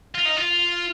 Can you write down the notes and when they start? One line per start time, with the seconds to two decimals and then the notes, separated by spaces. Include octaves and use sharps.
0.15 F4
0.25 D#4
0.37 F4